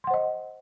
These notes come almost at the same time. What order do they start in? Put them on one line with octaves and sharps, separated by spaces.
C6 F#5 C5 D#5